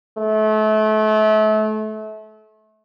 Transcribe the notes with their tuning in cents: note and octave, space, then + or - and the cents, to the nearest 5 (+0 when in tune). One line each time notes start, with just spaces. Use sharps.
A3 -30